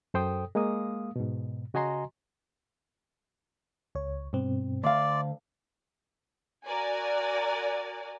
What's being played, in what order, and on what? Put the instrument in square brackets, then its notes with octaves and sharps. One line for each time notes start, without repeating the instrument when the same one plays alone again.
[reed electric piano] F#2 A4 C5 G5 D#6
G#3 A#3 F5 D#6
G#2 B2
C#3 F#4 D#5 G#5 A#5 C6
[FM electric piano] C#2 C#5
G2 B2 C4
[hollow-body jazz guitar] D2 F5 [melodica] D5 [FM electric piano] E5 C6 A6
[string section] F#4 A#4 D5 G#5